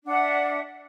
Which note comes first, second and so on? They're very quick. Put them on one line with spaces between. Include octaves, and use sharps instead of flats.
D4 F#5 E5